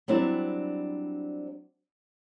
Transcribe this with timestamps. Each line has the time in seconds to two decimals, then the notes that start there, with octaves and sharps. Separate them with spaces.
0.08 F#3 G3 C4 D4 E4